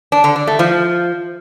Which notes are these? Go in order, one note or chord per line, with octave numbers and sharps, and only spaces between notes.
D4
D3
D4
A3
F3